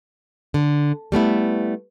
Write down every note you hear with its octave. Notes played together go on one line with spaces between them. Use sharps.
D3
G3 A3 B3 E4